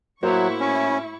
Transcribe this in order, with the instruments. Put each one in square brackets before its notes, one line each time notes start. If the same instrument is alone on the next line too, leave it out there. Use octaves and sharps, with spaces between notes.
[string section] A2 E4 C#6 [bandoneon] F#3 [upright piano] A#3 F#4 C5
[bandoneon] C#4